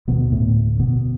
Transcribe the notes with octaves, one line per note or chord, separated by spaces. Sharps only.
D2 B2 D3 B3
A2 A3
F#2 B2 D3 B3